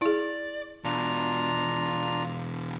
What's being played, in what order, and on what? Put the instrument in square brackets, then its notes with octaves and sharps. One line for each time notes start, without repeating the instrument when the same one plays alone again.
[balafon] E4 G#4 [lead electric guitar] D5
[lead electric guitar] E2 B2 [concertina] D4 F4 A#5